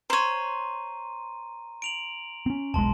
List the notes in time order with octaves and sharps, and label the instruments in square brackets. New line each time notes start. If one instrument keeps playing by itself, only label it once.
[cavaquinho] C5 C#5 [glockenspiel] A#5 C6 D#7
[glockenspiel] D7 F7 F#7
[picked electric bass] C4 C#4
[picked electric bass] E1 B1 G#3 [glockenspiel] A5 C6